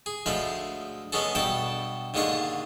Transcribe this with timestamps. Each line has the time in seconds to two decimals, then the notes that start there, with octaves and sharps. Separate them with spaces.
0.06 G#4
0.26 D2 F3 G#3 A3 F5 B5
1.12 G#3 B3 C#4 G#4 A4
1.35 G2 B2 A4 G5 A5
2.14 D#2 G#2 D3 G#3 F4 C#6